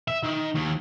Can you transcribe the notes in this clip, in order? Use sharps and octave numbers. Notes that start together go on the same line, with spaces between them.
E5
D#3
D#2